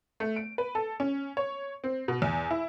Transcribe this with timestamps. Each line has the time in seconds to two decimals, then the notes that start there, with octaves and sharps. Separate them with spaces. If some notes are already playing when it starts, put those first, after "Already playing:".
0.20 A3
0.36 D7
0.58 B4
0.75 A4
1.00 C#4
1.37 C#5
1.84 C4
2.08 B2
2.22 E2
2.51 E4